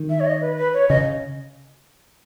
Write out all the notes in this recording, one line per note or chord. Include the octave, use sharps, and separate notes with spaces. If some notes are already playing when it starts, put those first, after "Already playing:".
Already playing: D#3
E5
C#5
D#5
B4
B4
C#5
C#3 D#5